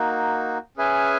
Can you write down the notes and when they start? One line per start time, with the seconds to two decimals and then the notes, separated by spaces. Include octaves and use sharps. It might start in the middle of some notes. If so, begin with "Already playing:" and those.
Already playing: A#3 D#4 F#4
0.77 C#4 G#4 B4 E5 G#5